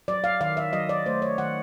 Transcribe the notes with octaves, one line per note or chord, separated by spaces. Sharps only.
F#3 D5
F5
D#3 F5
E5
F#3 D#5
D5
A3 C5
C#5
D#3 F#5